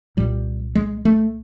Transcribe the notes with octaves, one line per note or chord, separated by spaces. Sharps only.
C2 A#2 G3
G#3
A3